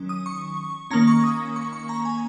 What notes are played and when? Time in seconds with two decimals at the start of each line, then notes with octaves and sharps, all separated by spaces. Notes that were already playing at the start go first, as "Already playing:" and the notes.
Already playing: D#3 F#3 C#4
0.09 D#6
0.26 C#6
0.91 D#3 A#3 C#4 A#5
1.07 C#6
1.24 D#6
1.56 C#6
1.73 C#6
1.89 A#5
2.05 G#5